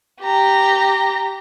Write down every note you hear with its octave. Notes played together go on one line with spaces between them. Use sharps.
G4 A#5